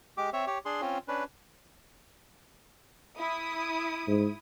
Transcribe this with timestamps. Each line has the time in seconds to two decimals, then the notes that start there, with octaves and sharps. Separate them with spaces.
0.17 G#3 G4 D6
0.33 C4 C#5 E5
0.47 G4 C#5
0.65 D4 G#4 C6
0.81 C4 C#4 F4
1.08 C#4 D4 B4
3.18 E4 D#6
4.07 G#2